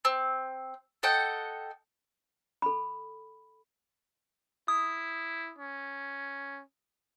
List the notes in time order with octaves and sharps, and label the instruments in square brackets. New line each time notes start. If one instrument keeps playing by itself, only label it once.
[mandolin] C4
A4 D#5 F#5 G5
[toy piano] A4 B5
[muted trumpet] E4 [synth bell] D#6
[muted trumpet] C#4